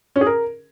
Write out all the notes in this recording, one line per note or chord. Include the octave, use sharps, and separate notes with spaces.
C#4
G#4
A#4